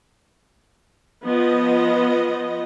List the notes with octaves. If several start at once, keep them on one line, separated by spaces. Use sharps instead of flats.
F3 B3 D#5